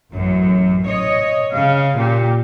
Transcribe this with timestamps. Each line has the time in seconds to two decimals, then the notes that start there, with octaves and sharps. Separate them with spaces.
0.12 A1 F#2
0.87 C#5 D#5
1.51 C#3 F5
1.97 A#2 G4